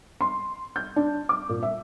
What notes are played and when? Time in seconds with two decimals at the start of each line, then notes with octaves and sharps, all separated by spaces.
0.21 C6
0.76 G6
0.96 D4
1.29 D6
1.49 A#2
1.63 E5